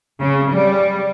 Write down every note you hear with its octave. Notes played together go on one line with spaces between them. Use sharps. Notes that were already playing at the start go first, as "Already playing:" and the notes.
C#3
G3